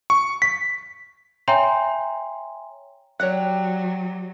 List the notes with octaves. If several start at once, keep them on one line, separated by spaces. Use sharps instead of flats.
C#6
B6
C#5 E5 G5 G#5 A#5 C6
F#3 G4 C#5 D5 F#5 F#6